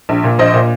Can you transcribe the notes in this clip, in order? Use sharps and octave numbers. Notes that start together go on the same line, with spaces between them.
A#1
A#2
A#1 C5 D#5
A#2